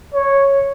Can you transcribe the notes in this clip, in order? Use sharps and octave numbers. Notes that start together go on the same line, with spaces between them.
C#5